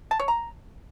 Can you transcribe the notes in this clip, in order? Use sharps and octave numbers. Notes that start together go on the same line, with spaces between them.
A5
C#5
A#5